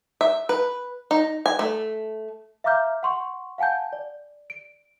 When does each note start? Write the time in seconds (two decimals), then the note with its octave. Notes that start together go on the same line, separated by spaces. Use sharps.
0.21 E5
0.49 B4
1.11 D#4
1.46 G#5
1.59 A3
2.64 E5 F5 A#5 D6 F6 G6
3.03 F#5 C6 C#6
3.58 F5 F#5 G#5 A5 G6
3.93 D5
4.50 D7